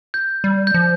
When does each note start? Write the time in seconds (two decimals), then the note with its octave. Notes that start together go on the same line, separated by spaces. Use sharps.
0.14 G6
0.44 G3
0.67 G6
0.74 F3